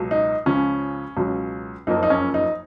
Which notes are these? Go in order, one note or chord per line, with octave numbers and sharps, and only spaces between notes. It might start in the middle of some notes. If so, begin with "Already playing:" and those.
Already playing: C#2 B2 F#3
D#4
C#2 C#3 F3 C#4
C#2 B2 F#3 C#4
F#1 F2 F3 A#3 D#4
D#4
C#4
D#4